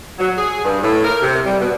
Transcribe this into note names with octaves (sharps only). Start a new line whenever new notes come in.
F#3
G#4
G2
A2
A#4
C3
G3
B2